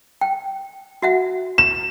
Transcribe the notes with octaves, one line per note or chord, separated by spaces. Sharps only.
G5
F#4 E5 F#5
E7